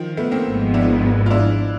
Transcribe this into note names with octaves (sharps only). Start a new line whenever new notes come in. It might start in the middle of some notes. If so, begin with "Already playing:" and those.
Already playing: D#3 F3
A3 B3
A#3 C4
G#1 G#2 F3 G#3 B3
D4 E4
F4
D4 E4